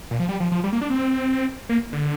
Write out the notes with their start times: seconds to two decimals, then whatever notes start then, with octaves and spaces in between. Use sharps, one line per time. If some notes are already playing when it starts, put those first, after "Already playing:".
0.11 A#2
0.20 F3
0.29 G3
0.40 F3
0.52 F3
0.64 G3
0.72 A#3
0.81 D4
0.90 C4
1.69 A#3
1.93 D3